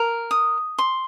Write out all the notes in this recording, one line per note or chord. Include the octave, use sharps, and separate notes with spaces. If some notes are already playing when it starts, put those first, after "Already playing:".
Already playing: A#4
D#6
C6